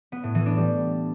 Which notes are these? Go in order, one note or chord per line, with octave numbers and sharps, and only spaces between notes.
B3
A2
E3
D4
G3